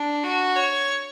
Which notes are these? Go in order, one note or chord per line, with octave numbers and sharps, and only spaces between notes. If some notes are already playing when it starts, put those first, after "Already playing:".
Already playing: D4
F#4
C#5